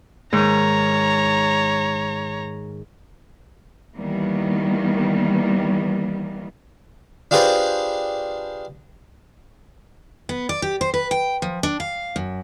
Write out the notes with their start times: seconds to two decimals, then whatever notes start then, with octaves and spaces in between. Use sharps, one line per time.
0.33 G#2 D#3 C#5 A#5
3.97 D#3 E3 G3 A#3 B3
7.31 D4 F4 G4 G#4 B4 C5
10.29 B3
10.49 D5
10.62 G4
10.81 C5
10.94 B4
11.11 G5
11.42 F3
11.63 D4
11.80 F5
12.16 F#2